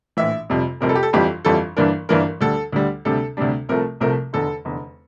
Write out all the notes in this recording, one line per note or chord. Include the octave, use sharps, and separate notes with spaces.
A#1 A2 E3 E5
F1 F2 C3 G3
F1 F2 C3 G3 A#4
A4
G4
A4
G1 F2 E3 G3 G4
G1 F2 E3 G3 A4
G1 G2 E3 A#3 D4 A#4
G1 G2 E3 A#3 D4 A#4
D2 D3 G3 A4
D2 D3 G3
D2 C3 G3 D4 A4
D2 C3 G3 D4
C2 C3 F3 A3 A#4
C2 C3 F3 A3 A#4
F1 E2 D3 A4
F1 E2 D3